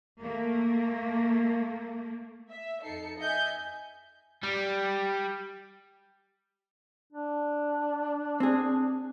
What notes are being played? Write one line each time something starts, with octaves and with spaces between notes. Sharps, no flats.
A3 A#3
E5
F2 D#4 A4 C7 C#7
D#5 E5 G#5 G6
G3
D4
C4 G#4